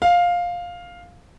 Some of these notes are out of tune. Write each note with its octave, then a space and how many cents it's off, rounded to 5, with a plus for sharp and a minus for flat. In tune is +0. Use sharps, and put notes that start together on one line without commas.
F5 +10